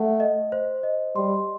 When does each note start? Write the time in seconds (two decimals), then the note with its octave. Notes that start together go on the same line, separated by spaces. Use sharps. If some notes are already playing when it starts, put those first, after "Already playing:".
Already playing: A3 F#5
0.20 D#5
0.52 C5
0.83 D#5
1.16 G3 C6